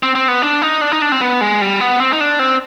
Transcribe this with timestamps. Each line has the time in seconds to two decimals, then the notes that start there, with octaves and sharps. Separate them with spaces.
0.03 C4
0.15 C4
0.28 B3
0.42 D4
0.62 D#4
0.81 D4
0.92 D#4
1.02 D4
1.12 C4
1.21 B3
1.41 G#3
1.61 G3
1.80 B3
2.00 C4
2.13 D#4
2.20 D4
2.39 C4